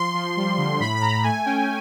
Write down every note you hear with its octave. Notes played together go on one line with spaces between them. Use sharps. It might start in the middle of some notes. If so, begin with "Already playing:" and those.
Already playing: F3 C6
F3
G3
D3
A2 B5
B5
A2 A#5
A3 G#5
C#4 G5